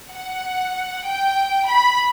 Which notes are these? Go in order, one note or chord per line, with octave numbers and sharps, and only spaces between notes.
F#5
G5
B5